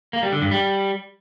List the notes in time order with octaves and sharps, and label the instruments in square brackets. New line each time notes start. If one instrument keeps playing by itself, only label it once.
[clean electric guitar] A#3
G3
D3
G2
G3